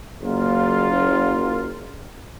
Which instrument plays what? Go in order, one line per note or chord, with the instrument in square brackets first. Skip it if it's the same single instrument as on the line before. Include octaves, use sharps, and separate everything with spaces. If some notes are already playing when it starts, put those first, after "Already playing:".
[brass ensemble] F#1 A#3 F4